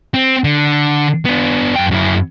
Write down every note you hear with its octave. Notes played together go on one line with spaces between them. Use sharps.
C4
D3
B3 D4
F#2 G5
F#2 E4